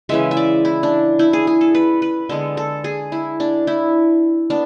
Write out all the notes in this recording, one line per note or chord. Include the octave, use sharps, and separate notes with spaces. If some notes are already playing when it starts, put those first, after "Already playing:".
C#3 E3 G#3 E5
E5
D5
E4
D4
E4
G#4
G#4
A4
B4
B4
D3 G#3 B3 A4
A4
G#4
E4
D4
E4
B3 D4